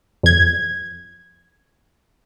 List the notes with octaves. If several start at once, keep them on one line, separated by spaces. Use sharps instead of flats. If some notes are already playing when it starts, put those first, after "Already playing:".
F2 G#6